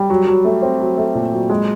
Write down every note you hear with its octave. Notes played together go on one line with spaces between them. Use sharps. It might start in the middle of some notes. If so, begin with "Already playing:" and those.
Already playing: G3
F#3
F#3
A3
C4
F#3
A3
A#2
F#3
G#3